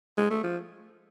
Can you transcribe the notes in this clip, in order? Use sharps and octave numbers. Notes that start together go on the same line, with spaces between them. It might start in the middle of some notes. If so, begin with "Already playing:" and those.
G#3
A3
F3